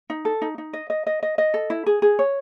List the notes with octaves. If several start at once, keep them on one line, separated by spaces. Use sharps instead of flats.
D#4
A4
D#4
D#4
D#5
D#5
D#5
D#5
D#5
A4
E4
G#4
G#4
C#5